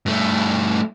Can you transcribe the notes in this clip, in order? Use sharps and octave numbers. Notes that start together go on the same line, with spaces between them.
G2 A3